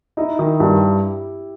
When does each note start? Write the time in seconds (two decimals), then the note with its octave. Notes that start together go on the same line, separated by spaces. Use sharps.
0.17 D#4 E4
0.39 D#3
0.60 G2 G4